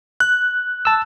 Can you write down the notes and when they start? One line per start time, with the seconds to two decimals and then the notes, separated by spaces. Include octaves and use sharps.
0.20 F#6
0.85 A5 E6